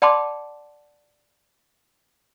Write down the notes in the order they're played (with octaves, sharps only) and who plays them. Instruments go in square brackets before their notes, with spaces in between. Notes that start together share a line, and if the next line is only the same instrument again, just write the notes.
[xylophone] D5 F#5 A5 B5 C6 D6